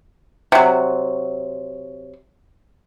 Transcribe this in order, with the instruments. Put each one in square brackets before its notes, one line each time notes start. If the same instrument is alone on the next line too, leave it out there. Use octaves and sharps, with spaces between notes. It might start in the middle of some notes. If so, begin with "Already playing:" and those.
[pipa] C3 F#3